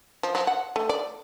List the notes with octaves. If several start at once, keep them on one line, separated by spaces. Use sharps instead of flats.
F3
F3
F#5
A3
D5